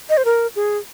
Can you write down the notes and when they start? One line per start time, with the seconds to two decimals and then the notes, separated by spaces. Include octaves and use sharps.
0.09 D#5
0.17 C5
0.25 A#4
0.56 G#4